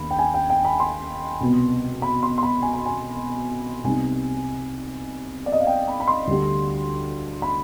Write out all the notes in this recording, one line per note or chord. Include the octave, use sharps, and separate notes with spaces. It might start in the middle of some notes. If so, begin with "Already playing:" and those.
Already playing: D#2 B3 D4 B5
G5
G#5
G5
G5
B5
C6
C2 B2 B3
B5
C6
C6
B5
G#5
B5
G#5
C2 C3 G3 B3 D#4 G#5
D5
D#5
F5
G5
B5
B5
C6
D2 D3 G3 D4
B5